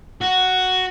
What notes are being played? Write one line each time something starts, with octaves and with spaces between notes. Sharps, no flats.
F#4